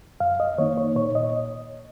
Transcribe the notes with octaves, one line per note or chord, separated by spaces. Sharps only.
F#2 F5
D#5
D#3 A#3 D#4 C#5
C#5
A#2 C#5
D#5